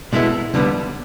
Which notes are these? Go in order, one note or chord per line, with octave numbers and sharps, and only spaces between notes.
B2 G#3 B3 E4 A4
D#2 D3 G3 B3